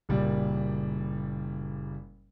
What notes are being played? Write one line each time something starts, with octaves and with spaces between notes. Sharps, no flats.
F#1 A#2 G3 D5